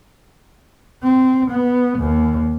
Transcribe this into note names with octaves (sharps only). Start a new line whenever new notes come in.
C4
B3
D#2